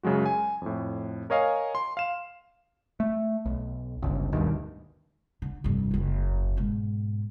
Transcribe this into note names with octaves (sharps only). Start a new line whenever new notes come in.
F#2 C#3 F#3 G#3 F#4
G#5
F2 A2
A#4 C#5 D#5 F5 G#5
C6
F5 E7
A3
B1
G1 C#2
E1 D2 G2 D#3
D3
F1 G2
F#1 E2
G#2 B2